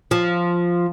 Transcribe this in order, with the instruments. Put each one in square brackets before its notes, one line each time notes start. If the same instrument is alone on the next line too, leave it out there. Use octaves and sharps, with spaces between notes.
[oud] F3